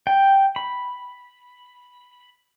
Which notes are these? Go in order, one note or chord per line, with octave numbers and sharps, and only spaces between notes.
G5
B5